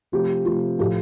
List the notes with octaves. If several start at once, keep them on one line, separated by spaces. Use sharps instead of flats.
C3 F3 A3 G4
C3 F3 A3 F4
A2 F3 A3 G4